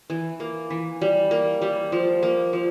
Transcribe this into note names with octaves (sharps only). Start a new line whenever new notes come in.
E3
A#3
E3
G3
A#3
G3
F3
A#3
F3